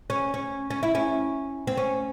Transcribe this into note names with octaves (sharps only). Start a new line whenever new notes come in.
C#4
C#4
C#4
E4
C#4
C4
C#4